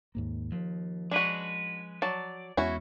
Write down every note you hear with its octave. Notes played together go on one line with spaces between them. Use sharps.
D#2 G#2 A#3
D#2 F3
G#3 C#4 D4 F#4 B4
F#3 D5 A5
E2 G#3 B3 C#4 E4 F#4